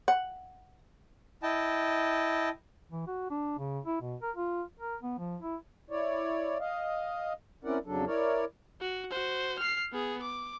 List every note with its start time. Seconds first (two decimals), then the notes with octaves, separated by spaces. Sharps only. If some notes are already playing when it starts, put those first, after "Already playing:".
0.08 F#5
1.43 E4 D#5 G5 A5
2.92 E3
3.07 F#4
3.30 D4
3.59 C#3
3.86 E4
4.01 B2
4.22 A#4
4.36 F4
4.80 A#4
5.03 B3
5.18 F3
5.42 E4
5.90 E4 C#5 D5
6.60 D#5 F5
7.65 C4 C#4 E4 A#4 D5 F#5
7.86 F2 C#3 F#3 D4 A4
8.07 E4 A#4 C#5 D5
8.81 F#4
9.11 F#4 C5
9.59 F6 C7
9.92 B3 G#4
10.22 D6